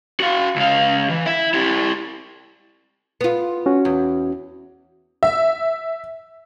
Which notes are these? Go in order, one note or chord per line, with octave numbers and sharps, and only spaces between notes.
F#4 F5
C#2 F5
E3
E4 E5
E4 G4
B3 F4
C#4 F#4
E2
E5